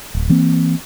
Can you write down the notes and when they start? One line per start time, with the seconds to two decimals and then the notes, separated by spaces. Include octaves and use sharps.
0.14 D1
0.29 E3 A#3 C4